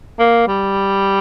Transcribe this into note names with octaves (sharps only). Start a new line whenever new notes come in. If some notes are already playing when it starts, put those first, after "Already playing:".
A#3
G3